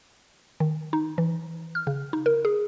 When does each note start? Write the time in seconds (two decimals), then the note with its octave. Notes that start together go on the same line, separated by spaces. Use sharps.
0.60 D#3
0.93 D#4
1.18 E3
1.75 F6
1.87 C#3
2.13 D#4
2.26 A#4
2.45 G#4